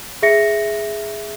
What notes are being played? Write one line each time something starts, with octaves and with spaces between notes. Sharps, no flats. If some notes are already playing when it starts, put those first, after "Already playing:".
G#4 E5 A#6 C#7